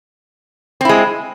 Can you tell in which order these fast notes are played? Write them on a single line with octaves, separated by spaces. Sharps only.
C4 E4 G#3